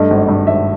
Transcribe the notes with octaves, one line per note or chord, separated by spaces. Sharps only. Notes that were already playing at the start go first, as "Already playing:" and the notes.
Already playing: G2 A3 D#5
G#1
G2
G#1 E5